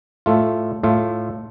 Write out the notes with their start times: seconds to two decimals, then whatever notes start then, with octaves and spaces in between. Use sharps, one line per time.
0.26 A2 A3 F4
0.83 A2 A3 F4